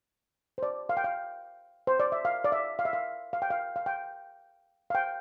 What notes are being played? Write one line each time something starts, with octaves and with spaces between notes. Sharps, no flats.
C5
D5
F5
G5
F5
C5
D5
E5
F5
D5
E5
F5
E5
F5
F5
G5
F5
F5
G5
F5
G5